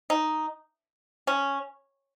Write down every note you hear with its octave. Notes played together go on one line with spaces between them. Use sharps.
D#4
C#4